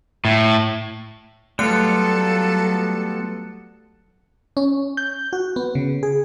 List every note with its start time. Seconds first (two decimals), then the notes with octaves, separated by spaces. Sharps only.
0.25 A2
1.59 F#3 G3 A3 B3 F4 A4 F#6 C#7
4.57 C#4
4.97 G6
5.33 F#4
5.56 B3
5.75 C#3
6.03 G#4